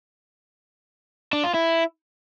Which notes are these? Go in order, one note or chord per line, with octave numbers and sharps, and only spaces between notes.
D4
F4
E4